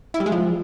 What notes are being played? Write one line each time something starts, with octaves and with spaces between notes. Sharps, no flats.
E4
G3
G#3
F3